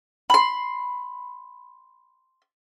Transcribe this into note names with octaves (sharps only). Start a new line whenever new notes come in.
B5 C6